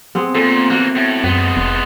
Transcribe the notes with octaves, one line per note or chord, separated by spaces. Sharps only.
B3 C4 G#4
A#2 A4
E3 A#3 F#4
A2
F#2 G#3 B3
F1